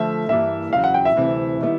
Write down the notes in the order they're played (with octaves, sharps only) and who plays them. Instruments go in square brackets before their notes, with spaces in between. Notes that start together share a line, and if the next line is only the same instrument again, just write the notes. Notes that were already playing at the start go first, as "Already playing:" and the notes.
Already playing: [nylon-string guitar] D3 F3 A3 [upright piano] E5
[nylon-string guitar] G2 E3 G3 A#3 [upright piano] E5
[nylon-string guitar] E2 C#3 F#3 [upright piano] F5
[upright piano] F#5
G5
E5
[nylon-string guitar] D2 C3 E3 G3 C4
D#3 G3 B3 E4